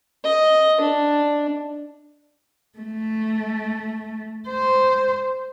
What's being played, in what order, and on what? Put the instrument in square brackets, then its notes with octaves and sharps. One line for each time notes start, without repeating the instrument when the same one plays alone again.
[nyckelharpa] D#5
D4
[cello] A3
C5